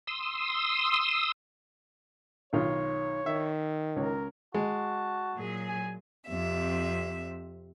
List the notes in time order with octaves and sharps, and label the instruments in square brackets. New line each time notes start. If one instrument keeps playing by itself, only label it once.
[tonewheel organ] C6 D#6 E6
[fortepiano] B1 D#3 F4 [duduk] C#5
[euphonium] D#3 [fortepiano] E5
[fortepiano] C#2 C#5 [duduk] A#4
[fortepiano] G#3 [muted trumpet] F#4 [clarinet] A5
[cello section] A#2 F#3 G#4
[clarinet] G#5
[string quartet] F2 C3 E5